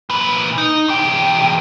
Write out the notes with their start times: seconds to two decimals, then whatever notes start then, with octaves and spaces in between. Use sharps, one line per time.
0.10 A#2 B4
0.58 D#4
0.88 E2 G5